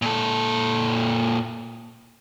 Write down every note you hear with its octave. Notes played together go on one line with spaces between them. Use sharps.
A#2 A4